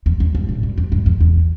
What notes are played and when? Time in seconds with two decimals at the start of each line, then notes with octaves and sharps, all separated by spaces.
0.06 E2
0.20 F2
0.35 G2
0.49 A2
0.63 G2
0.78 F2
0.92 G2
1.06 E2
1.21 E2